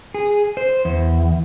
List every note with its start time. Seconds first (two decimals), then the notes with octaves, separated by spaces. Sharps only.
0.14 G#4
0.57 C5
0.85 E2